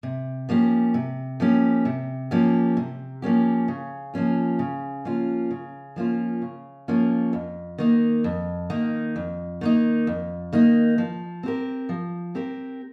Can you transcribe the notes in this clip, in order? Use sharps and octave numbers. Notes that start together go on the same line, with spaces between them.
C3
F3 A#3 C#4 G4
C3
F3 A#3 C#4 G4
C3
F3 A#3 C#4 G4
C3
F3 A#3 C#4 G4
C#3
F3 A#3 C#4 F4
C#3
F3 A#3 C#4 F4
C#3
F3 A#3 C#4 F4
C#3
F3 A#3 C#4 F4
F2
D#3 A#3 D#4
F2
D#3 A#3 D#4
F2
D#3 A#3 D#4
F2
D#3 A#3 D#4
F3
C4 G4 A#4
F3
C4 G4 A#4